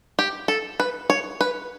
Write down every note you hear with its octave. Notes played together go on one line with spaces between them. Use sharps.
G4
A4
B4
C#5
B4